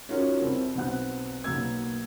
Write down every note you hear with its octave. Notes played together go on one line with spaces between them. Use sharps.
C#4 D#4 F4 F#4 A#4 C#5
C2 C4 E4
B1 B3 C4 F#5 F#6
B1 A#3 B3 E6 G#6